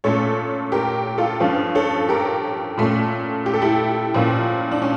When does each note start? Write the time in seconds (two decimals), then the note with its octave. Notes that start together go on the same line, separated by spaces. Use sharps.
0.04 A#2 A3 C#4 A4 C#5
0.72 G4 A#4
1.18 F4 A4
1.40 G2 F3 C#4
1.75 A4 C#5
2.09 G4 A#4
2.77 A#2 A3 C#4
3.46 G4
3.54 A4
3.62 E4 G4
4.14 A#2 F3 A#3 C#4
4.71 D4
4.82 C#4